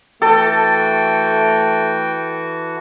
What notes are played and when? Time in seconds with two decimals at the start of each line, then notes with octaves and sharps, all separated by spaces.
0.22 E3 A3 F#4 A4 G5